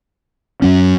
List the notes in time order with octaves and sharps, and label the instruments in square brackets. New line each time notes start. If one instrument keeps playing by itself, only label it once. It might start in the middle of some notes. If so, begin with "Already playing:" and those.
[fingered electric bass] F#2 F#3 C#4